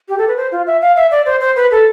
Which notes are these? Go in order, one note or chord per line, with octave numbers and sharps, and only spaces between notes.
G4
A4
B4
C5
F4
E5
F5
E5
D5
C5
C5
B4
A4